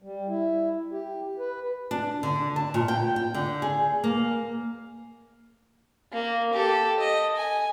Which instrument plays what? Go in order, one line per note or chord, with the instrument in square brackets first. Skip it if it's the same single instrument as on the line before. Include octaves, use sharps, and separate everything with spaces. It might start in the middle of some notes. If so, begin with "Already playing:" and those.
[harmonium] G3
E4
G4
B4
[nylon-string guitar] D4
D3
A5
A#2
G5
G5
D3
G#4
A#3
[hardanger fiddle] A#3
G4 A4
D#5
G#5